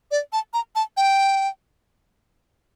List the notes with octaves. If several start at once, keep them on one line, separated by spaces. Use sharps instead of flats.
D5
A5
A#5
A5
G5